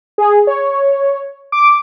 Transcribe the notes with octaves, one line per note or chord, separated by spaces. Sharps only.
G#4
C#5
D6